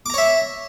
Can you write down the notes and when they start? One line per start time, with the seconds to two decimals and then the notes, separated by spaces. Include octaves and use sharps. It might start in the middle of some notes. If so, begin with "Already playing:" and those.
0.06 D6
0.10 A#5
0.14 C#5
0.18 E5